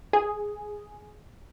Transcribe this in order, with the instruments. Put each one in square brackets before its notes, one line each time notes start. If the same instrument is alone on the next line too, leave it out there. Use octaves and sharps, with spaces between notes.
[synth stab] G#4